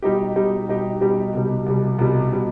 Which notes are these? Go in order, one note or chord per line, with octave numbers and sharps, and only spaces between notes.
B2 G3 D#4 G4
B2 G3 D#4 G4
B2 G3 D#4 G4
B2 G3 D#4 G4
C2 B2 G3
C2 B2 G3
C2 B2 G3
B2 G3